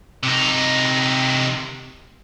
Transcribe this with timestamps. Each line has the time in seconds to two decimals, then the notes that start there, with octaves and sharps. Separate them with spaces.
0.23 C3 D#4